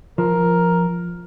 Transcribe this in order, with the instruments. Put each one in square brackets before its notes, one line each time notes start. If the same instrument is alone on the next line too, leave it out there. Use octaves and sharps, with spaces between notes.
[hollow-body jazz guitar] F3 [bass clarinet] A#4